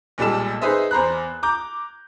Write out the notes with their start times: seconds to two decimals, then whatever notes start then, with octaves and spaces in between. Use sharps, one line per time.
0.18 B1 A#2 G3 G#3 A4 E7
0.62 D#4 G#4 B4 C5 D#5 E5
0.91 E2 C5 A#5 B5 F#6
1.43 A#5 D6 G6